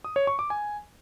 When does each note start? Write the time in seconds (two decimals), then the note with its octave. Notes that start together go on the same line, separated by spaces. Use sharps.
0.05 D#6
0.16 C#5
0.27 C#6
0.39 D6
0.50 G#5